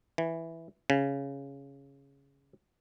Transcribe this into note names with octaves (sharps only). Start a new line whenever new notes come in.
E3
C#3